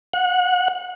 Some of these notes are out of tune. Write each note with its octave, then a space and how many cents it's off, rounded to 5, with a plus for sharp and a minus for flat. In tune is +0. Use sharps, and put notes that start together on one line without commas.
F#5 -25